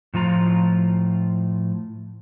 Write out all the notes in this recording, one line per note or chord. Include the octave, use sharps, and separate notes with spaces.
A2 F3 F4 A#5